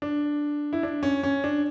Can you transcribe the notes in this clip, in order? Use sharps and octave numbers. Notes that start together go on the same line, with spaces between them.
D4
E4
D4
C#4
C#4
D4